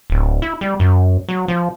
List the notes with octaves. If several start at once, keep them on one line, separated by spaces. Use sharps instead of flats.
D1
E4
G3
F#2
F#3
F3